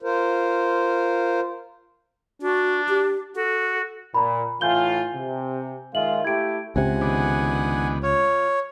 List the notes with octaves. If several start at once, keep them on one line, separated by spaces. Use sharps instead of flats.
F4 A#4 C5
D4 F#4
G4
F#4 A4
A#2 A#5 B5
A2 E3 F4 G#5 G6 G7
C3
D#3 G#3 F4 E5 F#7
A3 E4 G4 G#6 D7
C#2 C3 F#5 G#5
D#3 B3 D4
F4 C#5